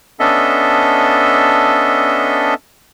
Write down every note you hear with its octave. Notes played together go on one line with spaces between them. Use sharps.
B3 C#4 D4 A4 D#5 E5